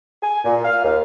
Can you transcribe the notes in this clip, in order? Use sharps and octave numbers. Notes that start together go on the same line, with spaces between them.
G#5
A#2
F5
D#2